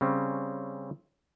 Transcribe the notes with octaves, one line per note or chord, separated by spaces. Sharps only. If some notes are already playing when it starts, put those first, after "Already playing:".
C#3 G3 C4 C#4